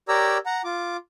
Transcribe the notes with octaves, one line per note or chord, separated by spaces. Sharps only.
G4 A#4 C#5 D5 A#5 E6
F#5 A#5
F4 D6